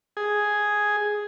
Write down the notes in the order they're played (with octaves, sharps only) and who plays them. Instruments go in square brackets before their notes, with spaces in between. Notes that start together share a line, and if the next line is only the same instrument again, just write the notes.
[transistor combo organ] G#4